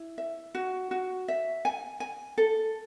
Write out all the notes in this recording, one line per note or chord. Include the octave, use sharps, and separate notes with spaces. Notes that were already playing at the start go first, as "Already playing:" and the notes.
Already playing: E4
E5
F#4
F#4
E5
G#5
G#5
A4